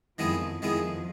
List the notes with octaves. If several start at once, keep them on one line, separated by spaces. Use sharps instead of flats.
F2 D#3 F3 G#3 B3 E4 G#4
F2 D#3 F3 G#3 B3 E4 G#4